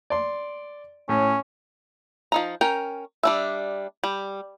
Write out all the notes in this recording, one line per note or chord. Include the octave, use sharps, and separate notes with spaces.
D5 C6
A2 C#4
F3 D#4 A#5
C#4 A#4 G5
G3 D4 E5
G3